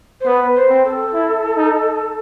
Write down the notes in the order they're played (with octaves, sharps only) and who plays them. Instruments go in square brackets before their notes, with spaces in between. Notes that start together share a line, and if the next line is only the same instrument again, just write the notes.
[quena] C5
[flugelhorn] B3 [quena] B4
[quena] C5
[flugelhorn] C4
[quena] A4
[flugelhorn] E4
D#4